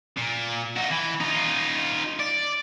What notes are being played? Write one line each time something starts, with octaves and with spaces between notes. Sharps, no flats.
A#2
D#4 F#4
E3
D#4 F4
D5